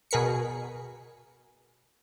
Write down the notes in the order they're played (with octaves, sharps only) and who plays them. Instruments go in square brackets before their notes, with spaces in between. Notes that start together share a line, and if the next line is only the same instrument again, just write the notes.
[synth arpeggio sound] B2 G#4 A#4 B6 C#7